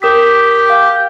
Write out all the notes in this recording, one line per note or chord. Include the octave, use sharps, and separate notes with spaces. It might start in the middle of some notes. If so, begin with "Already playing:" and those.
G4 A#4 D#6 B6
F5 G6